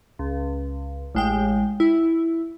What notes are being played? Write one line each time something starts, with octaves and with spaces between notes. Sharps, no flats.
C#2
A1 G#3 G5
E4